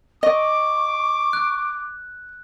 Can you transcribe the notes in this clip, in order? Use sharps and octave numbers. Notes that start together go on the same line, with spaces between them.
D#5 C#6 D6
F#6